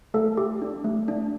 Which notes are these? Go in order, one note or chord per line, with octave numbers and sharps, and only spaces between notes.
A3 A4
G4
D4
A3
D4